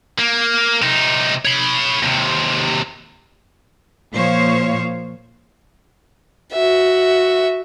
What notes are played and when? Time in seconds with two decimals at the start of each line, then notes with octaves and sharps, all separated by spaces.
0.19 A#3
0.82 C3 D#4
1.45 C#5 B5
2.03 D#2 C3
4.13 A#2 F3 C5 C#5 F5
6.53 F#4 E5